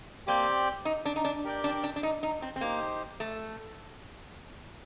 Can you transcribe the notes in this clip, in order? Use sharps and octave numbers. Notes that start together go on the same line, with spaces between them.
A#3 C4 G4 D5 G5
D#4
D4
D#4
D4
G4 A#4 D5 G5
D4
D4
D4
D#4
D#4
C4
C4
A#3 D#4 G4 C5
A3